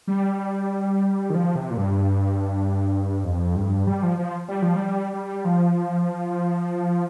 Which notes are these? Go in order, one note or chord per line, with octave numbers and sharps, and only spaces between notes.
G3
D#3
F3
C3
A#2
G2
F2
G2
G3
F3
F3
G3
F3
G3
G3
F3